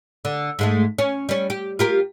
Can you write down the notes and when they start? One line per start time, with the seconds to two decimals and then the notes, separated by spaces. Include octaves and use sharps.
0.25 D3
0.59 G#2 G#3 A3
0.98 C#4
1.29 G3 C#4
1.50 G4
1.79 F4 G4 A#4